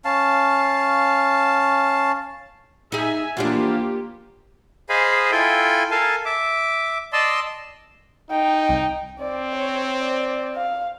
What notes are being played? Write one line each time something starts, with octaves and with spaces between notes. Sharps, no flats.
C#4 F5 A5
D#4 G#4 E5 G#5
E2 F3 A#3 D4 F4 G4
G#4 C5 D#5 F5 G#5 B5
E4 F4 A4 G5 G#5
A4 A#4 F5 G#5 A5
E5 D6
D5 D#5 A5 C6 E6
D#4 G5
C2
C4 D5
C#5
D5
F5